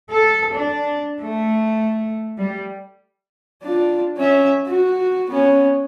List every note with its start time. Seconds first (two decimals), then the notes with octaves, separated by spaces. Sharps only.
0.11 A4
0.53 D4
1.18 A3
2.38 G3
3.63 D4 F4
4.18 C#4 E5
4.67 F#4
5.30 B3 C#4